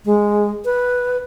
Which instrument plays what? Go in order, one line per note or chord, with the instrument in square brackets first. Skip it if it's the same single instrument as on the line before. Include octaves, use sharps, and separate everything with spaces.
[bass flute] G#3
B4